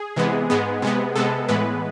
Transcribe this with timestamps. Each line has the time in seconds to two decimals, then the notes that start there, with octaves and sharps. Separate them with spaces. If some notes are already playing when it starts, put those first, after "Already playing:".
Already playing: G#4
0.16 C3 E3 G#3 B3
0.50 G#2 G#3 B3
0.82 C3 G#3 B3
1.15 C3 G#3 B3 A4
1.49 A2 E3 G#3 B3 B4